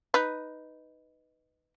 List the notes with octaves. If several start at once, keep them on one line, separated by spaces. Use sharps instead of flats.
D#4 B4